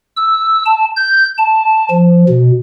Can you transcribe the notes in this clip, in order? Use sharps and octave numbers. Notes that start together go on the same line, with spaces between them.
E6
A5
G6
A5
F3
B2